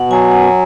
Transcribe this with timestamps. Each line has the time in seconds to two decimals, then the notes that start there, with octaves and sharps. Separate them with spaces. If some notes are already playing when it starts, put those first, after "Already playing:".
Already playing: B2 F#5
0.10 F#3 G#5
0.32 F#5